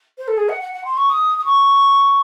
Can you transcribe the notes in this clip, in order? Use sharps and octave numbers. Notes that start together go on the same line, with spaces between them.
C5
A4
G#4
F#5
F#5
F#5
C6
C#6
D#6
D#6
C#6